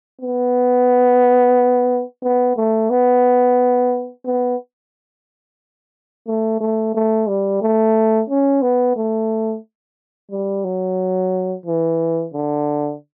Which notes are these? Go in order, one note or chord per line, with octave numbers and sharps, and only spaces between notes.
B3
B3
A3
B3
B3
A3
A3
A3
G3
A3
C#4
B3
A3
G3
F#3
E3
D3